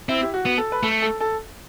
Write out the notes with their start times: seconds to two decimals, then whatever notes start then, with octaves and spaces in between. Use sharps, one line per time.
0.09 C4 E4
0.22 G4
0.34 F#4
0.46 B3
0.58 A4
0.72 B4
0.83 A3 A4
1.02 A4
1.20 A4